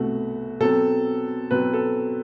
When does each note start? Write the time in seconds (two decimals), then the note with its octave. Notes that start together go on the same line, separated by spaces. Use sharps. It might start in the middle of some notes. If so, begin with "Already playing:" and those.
Already playing: C2 B2 A3 F#4
0.60 B2 F#3 C4 A4
1.51 B2 F#3 C4 B4
1.73 A4